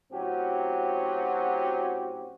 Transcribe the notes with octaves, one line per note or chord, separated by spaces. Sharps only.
A2 F#3 C4 C#4 F#4 G4